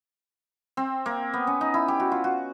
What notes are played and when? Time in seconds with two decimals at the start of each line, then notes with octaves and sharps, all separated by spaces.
0.77 C4
1.06 A#3
1.33 B3
1.47 C#4
1.61 D#4
1.74 E4
1.88 G4
2.00 F#4
2.12 F4
2.24 F#4